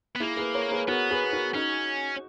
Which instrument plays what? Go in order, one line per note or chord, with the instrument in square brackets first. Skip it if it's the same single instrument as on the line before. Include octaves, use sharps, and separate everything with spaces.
[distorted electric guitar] B3
[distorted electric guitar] A#3 [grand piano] E4 G#4
[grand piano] G#4 B4
A#4 C#5
G#4 B4
[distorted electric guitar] B3 [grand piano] F#4 A#4
[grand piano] G#4 B4
F#4 A#4
[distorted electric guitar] C#4 [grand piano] D#4 F#4